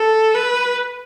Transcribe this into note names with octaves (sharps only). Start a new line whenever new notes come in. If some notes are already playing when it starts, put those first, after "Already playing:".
Already playing: A4
B4